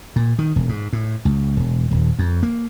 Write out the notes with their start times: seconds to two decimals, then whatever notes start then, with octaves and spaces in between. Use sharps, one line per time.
0.16 A#2
0.39 D#3
0.56 E1
0.69 G#2
0.93 A2
1.25 C#2
1.57 E1
1.91 D#1
2.19 F2
2.43 A#3